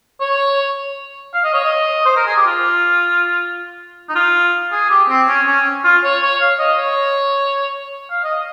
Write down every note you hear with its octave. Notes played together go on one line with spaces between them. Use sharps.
C#5
F5
D#5
C#5
D#5
C5
A#4
G#4
G4
F4
D#4
F4
G#4
G4
C4
C#4
C#4
F4
C#5
C#5
F5
D#5
C#5
F5
D#5